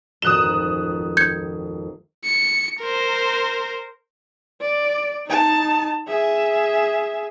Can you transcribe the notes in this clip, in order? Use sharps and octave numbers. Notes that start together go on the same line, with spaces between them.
D#1 G#1 F2 D#6 F#6 E7 G7
G6 G#6 C#7
C#7
A#4 C5
D5
D#4 A5
G#4 E5